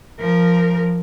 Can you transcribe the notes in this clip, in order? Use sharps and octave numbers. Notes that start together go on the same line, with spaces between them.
F3 A#4